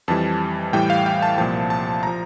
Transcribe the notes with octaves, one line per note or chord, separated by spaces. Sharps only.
F2 E3 G3 A5
A2 E3 G3 G5
F5
G5
A5
C2 A#2 F3 A5
A5
F3 A#5